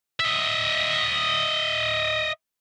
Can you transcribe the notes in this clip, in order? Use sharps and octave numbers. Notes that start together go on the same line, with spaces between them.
D#5 E5